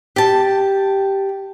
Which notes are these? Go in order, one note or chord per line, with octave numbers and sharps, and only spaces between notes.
G4 A5